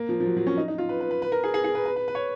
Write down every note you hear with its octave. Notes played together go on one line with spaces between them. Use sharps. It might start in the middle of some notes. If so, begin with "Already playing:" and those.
Already playing: A#3
F3
F3
F#3
F#3
C#4
D#4
D#4
F4
B4
B4
B4
B4
A#4
G#4
G#4
G#4
B4
B4
B4
B4
C#5